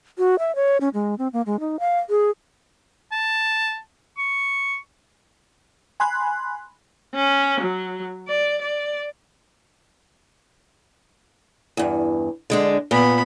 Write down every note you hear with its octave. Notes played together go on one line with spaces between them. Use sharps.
F#4
E5
C#5
C#4
G#3
C4
A#3
G#3
D#4
F5
G#4
A5
C#6
G#5 B5 C6 F#6
C#4
F#3
D5
D5
E2 G2
D3 G#3 D4
A#2 B3 B5